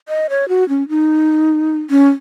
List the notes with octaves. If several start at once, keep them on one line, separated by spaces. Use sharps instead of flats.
D#5
C#5
F#4
C#4
D#4
C#4